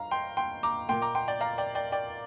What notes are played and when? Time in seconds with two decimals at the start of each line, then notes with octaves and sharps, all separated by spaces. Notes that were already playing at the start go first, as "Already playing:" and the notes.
Already playing: G2 F5 A#5
0.11 G5 C6
0.37 G5 C6
0.63 A#5 D6
0.89 A#2 A#3 G5 C6
1.02 A#5 D6
1.15 G5 C6
1.28 D5 G5
1.41 F5 A#5
1.58 D5 G5
1.75 D5 G5
1.92 D5 G5